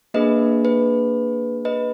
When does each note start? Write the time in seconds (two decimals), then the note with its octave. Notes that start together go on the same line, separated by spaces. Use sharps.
0.14 A#3 D4 G#4 B4 D#5
0.65 B4
1.65 B4 D#5